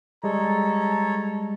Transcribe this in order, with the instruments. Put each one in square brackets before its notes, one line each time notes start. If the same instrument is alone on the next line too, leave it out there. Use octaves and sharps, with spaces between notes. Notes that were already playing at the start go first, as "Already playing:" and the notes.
[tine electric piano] G3 G#3 [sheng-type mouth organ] A4 C#5 [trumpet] A#5